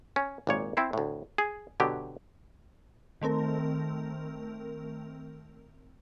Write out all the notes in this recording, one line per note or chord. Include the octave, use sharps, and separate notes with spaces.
C#4
G#1 A#2 C#5
C4 E4 C5
D2 A2
G#4
B2 D3 F#3 G4
D#3 A3 C4 A#4